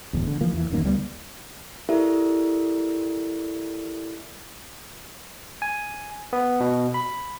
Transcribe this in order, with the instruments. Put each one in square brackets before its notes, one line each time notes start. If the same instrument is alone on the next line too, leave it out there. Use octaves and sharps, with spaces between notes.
[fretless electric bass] D1 E2
D3
E3 F3 A#3
E2 E3
D#1 F#2 D#3 A#3
D2 G3 B3
[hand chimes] E4 G4 A4 A#4 D5 E5
[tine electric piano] G#5
B3
B2
B5